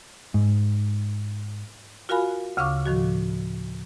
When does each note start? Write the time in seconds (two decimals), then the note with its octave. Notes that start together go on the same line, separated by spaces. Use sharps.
0.34 G#2
2.09 F4 F#4 A#4 F5 G#5 B5
2.57 D2 C#3 F5 C#6 D6
2.86 A2 D#3 F3 F#4